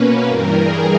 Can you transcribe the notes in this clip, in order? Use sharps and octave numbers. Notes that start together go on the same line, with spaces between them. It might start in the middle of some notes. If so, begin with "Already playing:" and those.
Already playing: B2 A#3 C#4 B4
G2 E3 G3 A#4
G#4